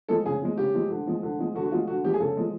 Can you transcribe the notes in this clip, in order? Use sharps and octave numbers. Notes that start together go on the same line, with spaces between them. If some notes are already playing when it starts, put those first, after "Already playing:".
F3 G#3 A4
C#3 G#4
F3 G#3
C#3 G4
F3 G#3
D3
F3 G#3
D3
F3 G#3
D3 F#4
F#4
F3 G#3 F4
D3 F#4
F3 G#3 G4
G#4
C#3 A4
F3 G#3